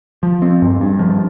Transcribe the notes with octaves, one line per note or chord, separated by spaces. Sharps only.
F3
C4
G2
G2
F3